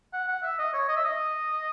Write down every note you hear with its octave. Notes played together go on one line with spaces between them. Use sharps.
F#5
F#5
E5
D#5
C#5
D#5
E5
D#5